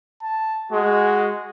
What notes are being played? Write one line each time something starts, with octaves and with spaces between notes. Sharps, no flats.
A5
G#3 F#4